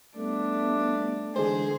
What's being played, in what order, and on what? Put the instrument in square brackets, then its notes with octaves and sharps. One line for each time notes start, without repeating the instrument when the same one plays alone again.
[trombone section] G3 A3 [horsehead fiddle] B3 [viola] D4
[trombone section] D3 E3 G#3 [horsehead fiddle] G#4 [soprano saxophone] C5